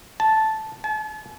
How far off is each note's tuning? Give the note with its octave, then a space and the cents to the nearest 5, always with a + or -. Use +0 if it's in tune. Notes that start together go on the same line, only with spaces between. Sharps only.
A5 -5
A5 -40